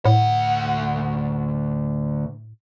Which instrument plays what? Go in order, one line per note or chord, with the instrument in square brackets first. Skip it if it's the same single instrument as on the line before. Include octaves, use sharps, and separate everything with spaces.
[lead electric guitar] D2 F#5 [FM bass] A2